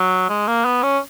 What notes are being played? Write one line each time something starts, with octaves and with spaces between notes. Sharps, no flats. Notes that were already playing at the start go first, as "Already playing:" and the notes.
Already playing: F#3
G#3
A#3
B3
C#4